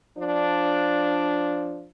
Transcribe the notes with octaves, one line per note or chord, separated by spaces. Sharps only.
F3 D4